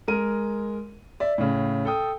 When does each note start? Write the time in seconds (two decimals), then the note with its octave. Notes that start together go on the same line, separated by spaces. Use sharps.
0.08 G#3 A#4 D#7
1.20 D5 E5
1.38 A2 C#3
1.85 A4 G5 D#6